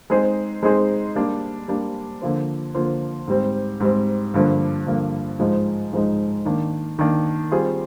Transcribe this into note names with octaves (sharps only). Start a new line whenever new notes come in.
G#3 C4 D#4 G#4 C5
G#3 C4 D#4 G#4 C5
G3 A#3 D4
G3 A#3 D4
D3 F3 A#3 F4 C5
D3 F3 A#3 F4 C5
G#2 G3 C4
G#2 G3 C4
G2 D3 F3 A#3
G2 D3 F3 A#3
G#2 F3 G#3 D#4
G#2 F3 G#3 D#4
D#3 A#3 D4
D#3 A#3 D4
G3 C4 F4 G#4